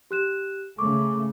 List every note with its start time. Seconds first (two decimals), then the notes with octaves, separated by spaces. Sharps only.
0.11 G4 F#6 E7
0.78 C#3 A3 C#6 D6